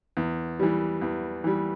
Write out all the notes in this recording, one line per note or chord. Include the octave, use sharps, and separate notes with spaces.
E2
E3 G3
E2
E3 G3